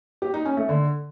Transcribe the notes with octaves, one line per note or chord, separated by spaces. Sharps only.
G4
D#4
C#4
A3
D3